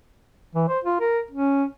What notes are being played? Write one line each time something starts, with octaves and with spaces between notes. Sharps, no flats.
E3
C5
F4
A#4
C#4